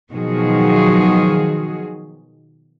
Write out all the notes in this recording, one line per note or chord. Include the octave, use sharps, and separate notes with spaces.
B2 D#3 F3 F#3 F#4 G#4